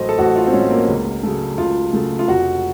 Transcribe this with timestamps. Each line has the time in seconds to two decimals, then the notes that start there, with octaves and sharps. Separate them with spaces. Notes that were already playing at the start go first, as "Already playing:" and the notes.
Already playing: A1 A2 F#3 A3 C5 D#5
0.09 A4
0.19 A1 F#4
0.36 F4
0.47 C4
0.53 A2 F#3 A3 C#4
0.70 A#3
0.88 C#2
1.23 C#3 F#3 A3
1.58 C#2 F4
1.93 C#3 F#3 A3
2.19 F4
2.28 F1 F#4